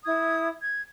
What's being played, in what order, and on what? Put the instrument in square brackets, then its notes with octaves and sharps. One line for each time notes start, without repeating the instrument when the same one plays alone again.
[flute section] E4 D#6 G#6
G#6